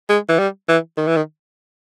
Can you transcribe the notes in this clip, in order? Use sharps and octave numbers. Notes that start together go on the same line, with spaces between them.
G#3
E3
G3
E3
D#3
E3
D#3